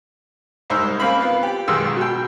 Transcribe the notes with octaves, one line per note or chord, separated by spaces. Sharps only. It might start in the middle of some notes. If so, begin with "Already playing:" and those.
C2 G#2 D#4 C5 E5
C#3 A#3 C4 B5
B3 F4
G4
B1 G#2 D#3 G#4 C6 E6
B2 G5